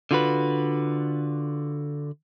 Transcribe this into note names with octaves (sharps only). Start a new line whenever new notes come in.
D3 F4 F#4 B4